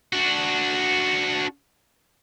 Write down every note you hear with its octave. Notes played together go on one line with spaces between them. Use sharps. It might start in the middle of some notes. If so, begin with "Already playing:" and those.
D4 F#4